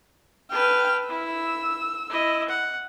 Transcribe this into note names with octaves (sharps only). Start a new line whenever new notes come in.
B4 G5 A5 F6
E4 E6
E4 D#5
F#5